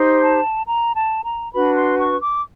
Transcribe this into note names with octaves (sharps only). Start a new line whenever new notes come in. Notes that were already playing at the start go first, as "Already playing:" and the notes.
Already playing: D#4 G4 C5
A5
A#5
A5
A#5
D4 F#4 B4 B5
C6
C#6
D6